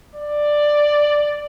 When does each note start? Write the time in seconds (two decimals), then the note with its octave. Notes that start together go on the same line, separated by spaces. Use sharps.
0.16 D5